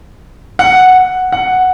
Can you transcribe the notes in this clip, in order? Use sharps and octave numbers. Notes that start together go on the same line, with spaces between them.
F#5
F#5